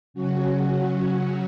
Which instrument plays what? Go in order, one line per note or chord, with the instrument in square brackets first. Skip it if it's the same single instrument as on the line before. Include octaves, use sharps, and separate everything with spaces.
[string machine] C#3 F#3 C#4 F#4